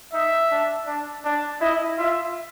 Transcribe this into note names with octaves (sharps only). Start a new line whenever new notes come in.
D#4 E5
D4
D4
D4
E4 D#5
F4 E5